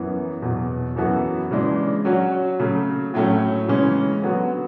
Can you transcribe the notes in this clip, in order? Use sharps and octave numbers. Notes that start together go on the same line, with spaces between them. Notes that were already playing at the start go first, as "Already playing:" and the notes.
Already playing: F#2 E3 B3
E2 B2 F#3
F#2 E3 B3 F#4 A4
C#3 E3 G#3 D4
F#3 C#4 F#4
C#3 F#3 A3
A2 F#3 A3 C#4
C#3 E3 G#3 C#4
D3 F#3 B3 F#4